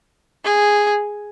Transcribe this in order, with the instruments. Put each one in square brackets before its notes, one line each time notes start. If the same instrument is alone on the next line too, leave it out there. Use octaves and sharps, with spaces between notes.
[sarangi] G#4